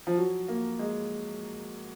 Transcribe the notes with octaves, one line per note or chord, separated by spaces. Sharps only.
F3
F#3
A#3
G#3